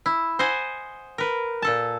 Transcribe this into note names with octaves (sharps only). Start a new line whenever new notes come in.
E4
C5 D#5 F#5 G#5
A#4 B4
A#2 A4 A5